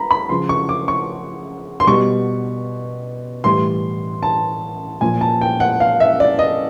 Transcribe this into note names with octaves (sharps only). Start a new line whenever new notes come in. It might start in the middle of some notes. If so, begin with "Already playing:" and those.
Already playing: A#5 B5
B5
C#3 F3 C6
C#6
D6
C#6
C6
B2 G3 C#6
A2 E3 G3 C6
A5
A#2 F3 G#5
A5
G5
F#5
F5
E5
D5
D#5